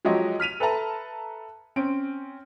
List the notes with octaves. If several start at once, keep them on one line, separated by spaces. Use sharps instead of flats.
F3 F#3 G#3 G4 C#5 D#5
F6 B6 D#7 F7
A4 B4 E5 A5 A#5
C4 C#4 D7